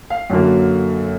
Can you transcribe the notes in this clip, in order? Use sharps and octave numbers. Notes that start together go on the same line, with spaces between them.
F5
F#2 D3 F#3 A#3